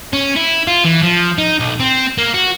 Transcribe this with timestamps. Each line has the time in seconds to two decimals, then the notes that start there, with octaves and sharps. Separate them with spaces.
0.13 C#4
0.36 E4
0.67 F4
0.84 E3
1.02 F3
1.38 D#4
1.60 B1
1.80 C4
2.18 A#3
2.34 F#4